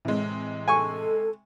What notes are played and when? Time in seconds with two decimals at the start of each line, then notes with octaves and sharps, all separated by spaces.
0.05 A2 C3 E3 G#3
0.68 A4 G#5 C#6